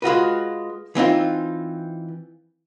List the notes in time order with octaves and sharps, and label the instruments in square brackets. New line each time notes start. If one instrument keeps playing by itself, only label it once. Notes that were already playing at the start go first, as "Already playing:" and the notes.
[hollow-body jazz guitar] G#3 F4 F#4 B4
E3 C4 D#4 F4